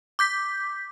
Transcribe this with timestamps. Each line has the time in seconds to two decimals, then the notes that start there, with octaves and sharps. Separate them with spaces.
0.19 D6 G6 B6